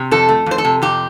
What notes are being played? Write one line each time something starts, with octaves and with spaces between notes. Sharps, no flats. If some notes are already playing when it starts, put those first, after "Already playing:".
Already playing: C3
F2 A4
A3
F2 C5
A4
C3
F2 G4